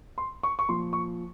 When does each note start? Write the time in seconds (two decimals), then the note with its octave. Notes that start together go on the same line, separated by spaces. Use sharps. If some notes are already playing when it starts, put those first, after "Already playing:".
0.18 C6
0.43 C#6
0.59 C#6
0.68 A#2 F3 C6
0.93 C#6